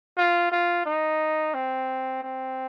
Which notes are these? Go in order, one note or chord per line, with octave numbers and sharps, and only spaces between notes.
F4
F4
D#4
C4
C4